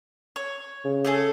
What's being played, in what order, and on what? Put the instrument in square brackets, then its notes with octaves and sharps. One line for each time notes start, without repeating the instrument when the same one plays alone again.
[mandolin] C#5
[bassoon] C#3
[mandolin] A3 G#4 A4